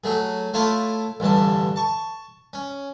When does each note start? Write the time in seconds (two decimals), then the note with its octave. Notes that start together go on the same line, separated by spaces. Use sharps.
0.04 F#3 A3 G#4
0.54 A3 E4 F4 C#5 A5
1.20 A1 G2 D3 A5
1.76 A5 C#6
2.53 C#4